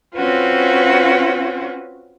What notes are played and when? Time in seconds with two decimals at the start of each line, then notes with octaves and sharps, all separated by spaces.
0.15 C4 C#4 F4 F#4 B4